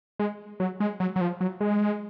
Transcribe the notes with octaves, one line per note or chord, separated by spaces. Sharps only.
G#3
F#3
G#3
F#3
F#3
F3
F#3
G#3